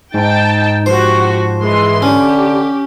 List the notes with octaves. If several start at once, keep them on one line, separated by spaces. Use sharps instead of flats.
G#2 D#4 G5 A5
F3 F#4 G4 C5
E3 G#3 C6
D3 C#4 G4